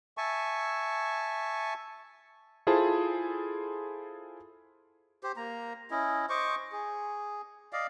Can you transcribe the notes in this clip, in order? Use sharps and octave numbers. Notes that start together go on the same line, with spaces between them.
E5 G#5 A5 C#6
E4 F4 G#4 A4 C5 A5
G4 C5
A#3 A#5
C#4 E4 D#5
C5 D#5 C#6 D6
G#4
D5 D#5 F5